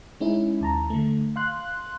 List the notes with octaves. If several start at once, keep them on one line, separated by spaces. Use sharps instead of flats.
G#3 C#4 D#4 E4
D#2 A5 A#5
D3 A3
F5 C6 F#6